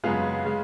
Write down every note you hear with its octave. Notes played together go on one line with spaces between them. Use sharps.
F#2 C#3 G#3 B3 F4 G#4
C#3 G#3